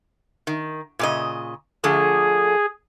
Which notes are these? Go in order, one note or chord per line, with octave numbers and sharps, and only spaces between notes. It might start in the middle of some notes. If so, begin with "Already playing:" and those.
D#3
A#2 C#3 D#5
D3 F3 A3 G#4